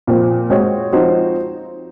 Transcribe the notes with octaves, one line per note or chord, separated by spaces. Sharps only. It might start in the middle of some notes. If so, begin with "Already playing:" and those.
A#2 F3 C4
G#3 C4 F#4 C#5
F3 C4 D#4 F#4 C5